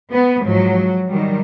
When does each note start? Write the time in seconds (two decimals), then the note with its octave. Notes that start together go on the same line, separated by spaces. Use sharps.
0.13 B3
0.46 G#2 F3 F#3
1.11 D#3 F#3 G3